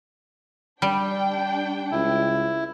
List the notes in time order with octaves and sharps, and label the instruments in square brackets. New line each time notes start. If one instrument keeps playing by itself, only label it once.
[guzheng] G3 [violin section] D4 G5
[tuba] C#2 [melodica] E4